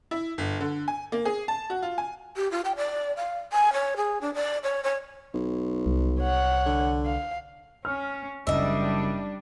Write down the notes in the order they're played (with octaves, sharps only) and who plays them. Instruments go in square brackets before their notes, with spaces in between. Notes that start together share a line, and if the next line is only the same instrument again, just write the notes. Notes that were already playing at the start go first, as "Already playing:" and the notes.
[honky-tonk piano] E4
G1
D3
G#5
A#3
G#4
A5
F#4
F4
G#5
[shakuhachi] G4
F4
G5
D5
F5
G#5
C#5
G#4
D4
D5
C#5
C#5
[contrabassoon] B1
[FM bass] C2
[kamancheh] C#5 F#5
[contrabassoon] D3
[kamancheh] F5
[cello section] C#4 [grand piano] F6
[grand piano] F#1 [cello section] G3 D4 [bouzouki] D#5 E5